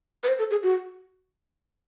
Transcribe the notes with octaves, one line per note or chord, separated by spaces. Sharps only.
B4
C5
A4
G#4
F#4